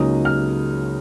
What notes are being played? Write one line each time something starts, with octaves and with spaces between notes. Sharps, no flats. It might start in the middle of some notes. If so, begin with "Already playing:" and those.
Already playing: C#2 C#3 F#3 A#3 D#4 D#6
F6